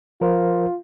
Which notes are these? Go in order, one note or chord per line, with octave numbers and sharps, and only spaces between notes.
F3 F4 A#4 C5